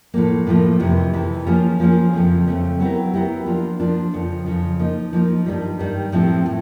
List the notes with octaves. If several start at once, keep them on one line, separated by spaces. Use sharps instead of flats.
A2 F3 A#3
A2 F3 A#3
F2 C3 E3
F2 C3 E3
F3 A#3 C#4 F4 G#4
F3 A#3 C#4 F4 G#4
F2 C#3 F3 A3 C4
F2 C#3 F3 A3 C4
F#3 B3 E4 G4 A#4
F#3 B3 E4 G4 A#4
F3 A#3 D4 F4
F3 A#3 D4 F4
F2 C#3 F3
F2 C#3 F3
F3 A#3 D#4
F3 A#3 D#4
G2 D#3 G3
G2 D#3 G3
A2 F3 A3 C4 F4
A2